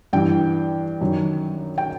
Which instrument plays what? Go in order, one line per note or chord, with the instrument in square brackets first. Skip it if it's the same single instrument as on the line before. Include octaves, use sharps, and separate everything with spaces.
[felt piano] G2 E3 G5
F#2 D#3
G5